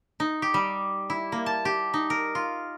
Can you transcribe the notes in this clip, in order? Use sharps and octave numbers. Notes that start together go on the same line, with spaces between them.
D#4
G4
G3
E4
A#3
A5
G4
D#4
A#4
F4